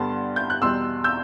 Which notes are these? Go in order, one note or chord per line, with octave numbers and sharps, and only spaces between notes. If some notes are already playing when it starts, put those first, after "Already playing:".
Already playing: G2 D3 G3 B3 A5 C6
G6
F#6
E2 B2 G3 C6 E6
E6 G6